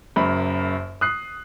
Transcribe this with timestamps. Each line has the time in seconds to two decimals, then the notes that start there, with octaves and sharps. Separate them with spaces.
0.16 F#1 F#2 B5
1.01 D#6 F#6 C7